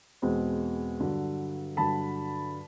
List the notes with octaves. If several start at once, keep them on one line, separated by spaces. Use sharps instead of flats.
E2 B2 G#3 C4
G2 D3 F#3
G2 D3 F#3 A5 B5